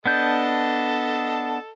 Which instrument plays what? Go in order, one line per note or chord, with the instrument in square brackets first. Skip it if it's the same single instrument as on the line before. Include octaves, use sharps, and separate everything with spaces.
[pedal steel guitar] B3 D4 G6 [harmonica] A4 D#5 A5